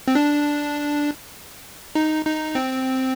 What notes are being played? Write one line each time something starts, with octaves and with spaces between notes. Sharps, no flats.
C4
D4
D#4
D#4
C4